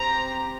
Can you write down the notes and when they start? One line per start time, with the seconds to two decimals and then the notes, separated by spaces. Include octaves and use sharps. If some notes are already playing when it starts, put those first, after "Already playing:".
Already playing: C4 G4 A#5